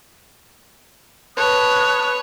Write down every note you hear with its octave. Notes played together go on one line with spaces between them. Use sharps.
B4 C#5 A5 D#6 F#6